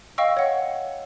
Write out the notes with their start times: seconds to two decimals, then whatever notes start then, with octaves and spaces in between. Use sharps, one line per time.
0.18 D#5 F5 G5 C#6 E6
0.37 C#5 F#5